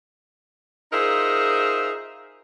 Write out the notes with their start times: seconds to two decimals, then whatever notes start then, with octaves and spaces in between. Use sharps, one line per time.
0.92 D#4 F4 G#4 A#4 C5 E5